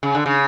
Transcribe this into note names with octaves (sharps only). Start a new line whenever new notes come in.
C#3
D3
C#3